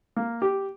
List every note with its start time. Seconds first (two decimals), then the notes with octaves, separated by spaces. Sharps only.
0.17 A#3
0.42 G4